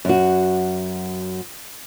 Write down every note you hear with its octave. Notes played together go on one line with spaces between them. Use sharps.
F#2 F#4